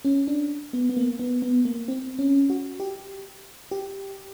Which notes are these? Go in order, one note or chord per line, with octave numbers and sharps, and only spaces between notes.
C#4
D4
B3
B3
A#3
B3
B3
A#3
C4
C#4
F#4
G4
G4